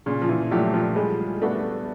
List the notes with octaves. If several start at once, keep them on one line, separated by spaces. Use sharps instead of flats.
A#2 C#3
F3
E3
F3 F#3 A3 D4 G4
F3
G3 G#3
A3 B3 D4 F#4